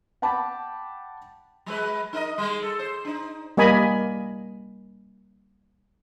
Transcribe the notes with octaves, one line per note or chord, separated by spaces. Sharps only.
F#5 G5 A5 B5 D6
F#3 G#3 B4
D#4 A#4 D#5
G3 G#3
A4
C5
D4 D#4
G3 A#3 D#5 G#5 B5